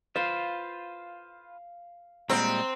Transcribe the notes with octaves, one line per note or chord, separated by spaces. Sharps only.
F4 B4 C5 F5
A#2 G3 G#3 C4 F#5 A#5